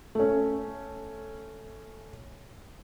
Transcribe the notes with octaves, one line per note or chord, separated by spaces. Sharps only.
A3 C#4